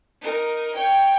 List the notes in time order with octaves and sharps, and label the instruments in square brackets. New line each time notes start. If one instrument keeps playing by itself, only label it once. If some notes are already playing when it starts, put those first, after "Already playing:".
[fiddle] D#4 A#4
C#5 G5